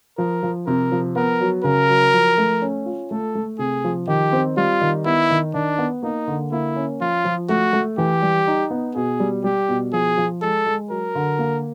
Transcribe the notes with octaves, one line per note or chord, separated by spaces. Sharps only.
F3 A#4
F3
C3 A#4
F3
B3 A#4
F#3
C#3 A#4
F#3
F3
A3
C#4
F4
A3 A4
A3
C3 G#4
F3
D#3 G4
C4
G3 F4
D#3
B3 E4
D#3
D#3 D4
B3
A#3 D#4
D3
A#3 E4
C#4
F3 F4
F3
A3 F#4
A3
E3 G4
G3
D#4
B3
B2 G#4
G3
G3 G4
B2
F3 G#4
F3
G#3 A4
G#3
F#3 A#4
D3
A#3